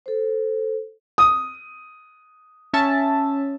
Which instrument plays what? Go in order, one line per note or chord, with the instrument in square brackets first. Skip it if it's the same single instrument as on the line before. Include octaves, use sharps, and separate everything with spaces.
[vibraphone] A4 C5
[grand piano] D#6
[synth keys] C#4 E5 A5